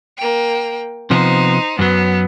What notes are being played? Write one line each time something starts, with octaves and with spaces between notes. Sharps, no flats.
A#3 G5
C3 F3 B3 D#4 C5
F#2 F#3 B3